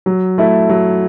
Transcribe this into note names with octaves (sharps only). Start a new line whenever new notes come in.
F#3
A3 E4 A4
F#3